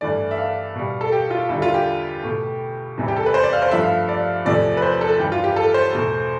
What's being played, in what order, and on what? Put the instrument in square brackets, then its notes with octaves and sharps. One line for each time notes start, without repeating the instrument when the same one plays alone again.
[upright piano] G2 E3 A3 D5
E5
F5
B2 G3
A4
G4
F4
E2 D3 G3 E4
F4
G4
B2 A3
E2 C3 E3 G3
G4
A4
B4
C5
D5
F5
C5
G2 F3 A3 E5
F5
D5
E2 C3 F3 A3 D5
B4
C5
A4
G2 E3 G3 G4
F4
G4
A4
C5
E2 B2 A3